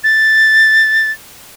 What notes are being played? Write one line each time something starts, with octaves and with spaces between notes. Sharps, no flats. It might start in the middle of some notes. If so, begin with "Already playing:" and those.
A6